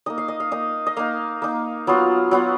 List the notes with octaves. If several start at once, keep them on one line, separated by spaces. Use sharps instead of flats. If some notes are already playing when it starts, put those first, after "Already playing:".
A#3 D#4 D#5
F5
D#5
F5
A#3 D#4 D#5
D#5
A#3 D#4 F5
A#3 D#4
F#3 B3 F4
F#3 B3 F4